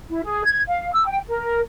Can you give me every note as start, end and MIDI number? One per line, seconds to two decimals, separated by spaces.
0.10 0.21 64
0.24 0.42 68
0.45 0.60 92
0.67 0.89 77
0.92 1.04 88
1.06 1.19 79
1.27 1.59 70